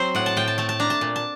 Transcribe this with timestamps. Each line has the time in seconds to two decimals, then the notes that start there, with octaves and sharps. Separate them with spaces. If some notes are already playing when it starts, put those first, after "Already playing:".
Already playing: F#3 C4 C5
0.15 A2 F#5
0.26 A5
0.37 A2 G5
0.48 A5
0.58 A3 A5
0.69 A5
0.80 D4 A#5
0.90 A5
1.01 A#2
1.16 A5